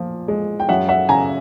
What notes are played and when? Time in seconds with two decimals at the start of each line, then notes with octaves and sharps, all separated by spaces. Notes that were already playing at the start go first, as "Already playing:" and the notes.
Already playing: A#2 F3
0.28 G#3
0.60 G5
0.69 F#2 E5 F#5
0.88 E5 F#5
1.09 C#3 G#5 A#5